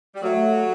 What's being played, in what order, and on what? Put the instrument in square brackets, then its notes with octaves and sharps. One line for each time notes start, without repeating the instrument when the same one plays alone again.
[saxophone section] G3
[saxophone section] F#3 [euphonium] A3